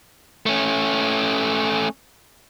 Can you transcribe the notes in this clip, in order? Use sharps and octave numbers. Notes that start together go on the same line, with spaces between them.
A3 C#4